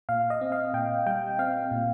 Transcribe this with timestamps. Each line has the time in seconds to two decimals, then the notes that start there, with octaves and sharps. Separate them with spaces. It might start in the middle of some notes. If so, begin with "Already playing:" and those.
0.09 A#2 F5
0.30 D#5
0.41 C4
0.52 F5
0.74 A#2 G5
1.06 G3 G5
1.39 C4 F5
1.71 A#2